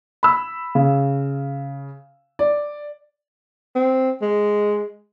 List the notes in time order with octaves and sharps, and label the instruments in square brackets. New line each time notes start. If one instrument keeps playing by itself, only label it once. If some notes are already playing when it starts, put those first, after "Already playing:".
[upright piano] B5 E6
C#3
D5
[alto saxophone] C4
G#3